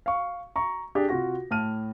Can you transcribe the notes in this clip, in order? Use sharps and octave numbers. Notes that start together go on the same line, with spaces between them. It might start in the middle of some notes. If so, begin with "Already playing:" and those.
F5 C#6
A#5 C#6
D4 G4 G#4
C3 F4 F#4 A#6
A2 A5 F6 D#7